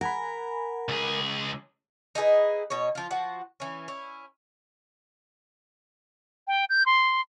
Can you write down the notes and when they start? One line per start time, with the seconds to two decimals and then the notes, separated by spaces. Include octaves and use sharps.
0.01 A#4 F#5 G#5 B5
0.89 C#2 G#4
2.15 D#4 E4 G#4 B4
2.70 B2 C#5
2.95 F3 F4
3.11 F3 F#4 F#5
3.60 E3 C#4
3.88 C#4 E4
6.47 G5
6.69 G6
6.86 C6